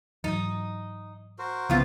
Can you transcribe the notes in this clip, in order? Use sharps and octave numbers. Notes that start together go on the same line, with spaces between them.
G#2 E3 F#3 D#4
F#4 A#4 C5
C2 A2 C#3 F3 B3 C4 F4